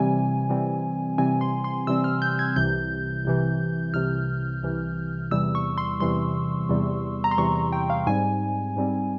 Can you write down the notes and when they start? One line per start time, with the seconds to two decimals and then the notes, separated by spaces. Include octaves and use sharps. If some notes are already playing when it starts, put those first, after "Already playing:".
Already playing: C3 E3 G3 C4 G#5
0.49 C3 E3 G3 C4
1.18 C3 E3 G3 C4 G#5
1.41 C6
1.64 C6
1.87 C3 E3 G3 C4 E6
2.04 F6
2.22 G6
2.39 G#6
2.56 C2 C3 E3 G6
3.25 C2 C3 E3
3.94 C2 C3 E3 F6
4.63 C2 C3 E3
5.31 E2 C3 E3 G3 E6
5.55 C#6
5.78 C6
6.00 E2 C3 E3 G3 C6
6.69 E2 C3 E3 G3
7.24 A#5
7.31 C6
7.38 E2 C3 E3 G3 C#6
7.56 A#5
7.72 G5
7.90 F5
8.07 G#2 G3 C4 G#5
8.76 G#2 G3 C4